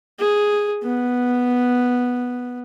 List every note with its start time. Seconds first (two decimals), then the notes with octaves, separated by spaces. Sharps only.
0.19 G#4
0.83 B3